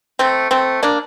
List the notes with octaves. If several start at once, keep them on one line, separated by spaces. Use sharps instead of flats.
A3 C4
A3 C4
A#3 D4